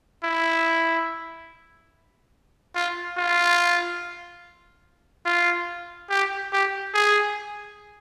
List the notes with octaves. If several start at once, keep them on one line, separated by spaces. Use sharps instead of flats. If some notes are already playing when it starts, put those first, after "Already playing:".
E4
F4
F4
F4
G4
G4
G#4